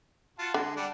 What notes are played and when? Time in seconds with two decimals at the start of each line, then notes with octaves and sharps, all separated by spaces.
0.39 F4 F#4 A5
0.54 D3 G#3
0.77 G3 D4 F#5